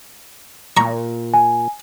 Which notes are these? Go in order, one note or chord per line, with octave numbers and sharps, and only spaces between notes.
A#2 A#5 C#6
G#5